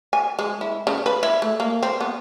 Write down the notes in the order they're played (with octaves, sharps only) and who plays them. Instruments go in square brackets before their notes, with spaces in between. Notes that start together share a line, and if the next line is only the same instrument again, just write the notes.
[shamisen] G#5
G#3
E4
C#3
B4
E4
A3
A#3
C4
B3